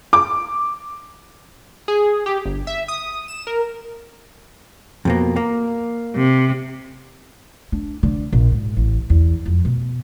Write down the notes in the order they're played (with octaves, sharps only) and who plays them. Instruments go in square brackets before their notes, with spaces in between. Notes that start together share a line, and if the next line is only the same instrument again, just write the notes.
[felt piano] D6
[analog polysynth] G#4
G4
G1
E5
D#6
E7
A#4
[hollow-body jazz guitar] F2 B2 A#3
A#3
[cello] C3
[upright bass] D4
D3
A#1
G#2
A1
E2
F2
B2